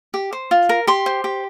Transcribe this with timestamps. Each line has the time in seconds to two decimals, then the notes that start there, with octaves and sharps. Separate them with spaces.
0.14 G4
0.33 C5
0.51 F4
0.69 A#4
0.87 G4 C6
1.06 C5
1.24 G4